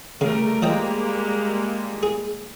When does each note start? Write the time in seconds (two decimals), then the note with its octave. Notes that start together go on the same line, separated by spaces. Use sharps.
0.21 C#3 G3 A3 A#4
0.62 F3 G3 G#3 A#3 D#5 G5
2.03 G#4